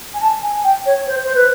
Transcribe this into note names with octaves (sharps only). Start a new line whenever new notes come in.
G#5
A5
G#5
G5
C#5
C5
C5
B4